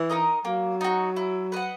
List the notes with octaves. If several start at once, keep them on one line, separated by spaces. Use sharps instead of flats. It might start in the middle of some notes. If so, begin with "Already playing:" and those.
Already playing: E3
D#4 A#4 D#5
F#3 A#3
D#4 F#4
E4
B4 D#5 F#5